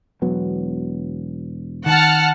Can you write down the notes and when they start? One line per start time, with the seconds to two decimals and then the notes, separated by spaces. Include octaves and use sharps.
0.22 E1 F#3 B3
1.86 D#3 F#5 A5 F6